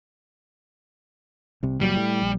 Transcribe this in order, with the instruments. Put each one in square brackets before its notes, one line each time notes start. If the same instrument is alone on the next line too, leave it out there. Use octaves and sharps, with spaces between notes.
[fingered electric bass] C2 C3
[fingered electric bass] F#1 A#2 F#3 [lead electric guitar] G3
[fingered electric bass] A2
A#1